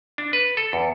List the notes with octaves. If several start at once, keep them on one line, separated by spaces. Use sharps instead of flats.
D4
B4
A4
E2